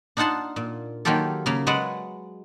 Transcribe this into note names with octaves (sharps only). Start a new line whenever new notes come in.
D4 D#4 F4 F#5 A5 C6
A#2
D#3 F#3 A#3 F4 G4 A4
C#3 A#3
F#3 G#3 B4 D5 F#5